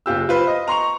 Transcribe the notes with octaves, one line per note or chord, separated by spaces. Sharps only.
F#1 F4 G4 E6
F4 B4 C5
D#5
A#5 C6 C#6 F7